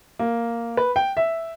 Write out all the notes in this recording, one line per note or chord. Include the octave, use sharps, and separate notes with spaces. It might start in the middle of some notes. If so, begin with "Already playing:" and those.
A#3
B4
G5
E5